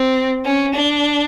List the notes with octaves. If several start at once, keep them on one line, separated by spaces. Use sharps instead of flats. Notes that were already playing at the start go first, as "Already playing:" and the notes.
Already playing: C4
C#4
D4